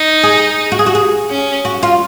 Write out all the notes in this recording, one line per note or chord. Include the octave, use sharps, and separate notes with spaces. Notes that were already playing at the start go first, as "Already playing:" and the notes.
Already playing: D#4
G#4
F#4
G#4
F#4
G#4
C#4
F#4
F4